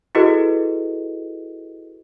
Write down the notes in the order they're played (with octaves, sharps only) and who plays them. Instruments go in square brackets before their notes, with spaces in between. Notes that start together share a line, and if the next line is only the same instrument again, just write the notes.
[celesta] E4 F#4 G#4 A4 B4 D#5